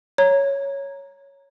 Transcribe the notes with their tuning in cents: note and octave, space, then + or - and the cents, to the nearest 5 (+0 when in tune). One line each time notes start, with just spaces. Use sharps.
C#5 +0 A#5 +0